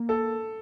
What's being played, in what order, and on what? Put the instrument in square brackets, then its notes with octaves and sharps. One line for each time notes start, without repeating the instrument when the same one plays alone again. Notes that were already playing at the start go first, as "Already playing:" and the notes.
Already playing: [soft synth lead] A#3
[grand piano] A4